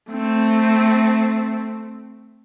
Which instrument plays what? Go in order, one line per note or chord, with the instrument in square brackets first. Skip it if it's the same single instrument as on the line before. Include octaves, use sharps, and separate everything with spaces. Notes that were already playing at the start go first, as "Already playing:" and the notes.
[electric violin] A3 C4